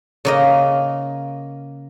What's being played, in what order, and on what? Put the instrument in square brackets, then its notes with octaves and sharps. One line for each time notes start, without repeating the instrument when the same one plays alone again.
[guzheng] C#3 A#3 D#5